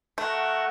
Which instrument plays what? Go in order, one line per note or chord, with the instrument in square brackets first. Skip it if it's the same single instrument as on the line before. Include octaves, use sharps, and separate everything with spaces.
[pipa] A3 [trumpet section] F#4 A#4 F#5